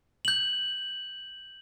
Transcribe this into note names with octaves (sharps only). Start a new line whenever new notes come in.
G6 F#7